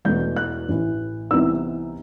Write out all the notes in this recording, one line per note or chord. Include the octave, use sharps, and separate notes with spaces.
E1 E2 B2 A3 E4 G6
F#6
A1 A2 E3
C2 C3 E3 B3 D#4 E6